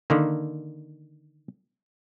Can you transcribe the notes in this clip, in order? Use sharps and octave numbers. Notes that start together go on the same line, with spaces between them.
D3 D#3 A#3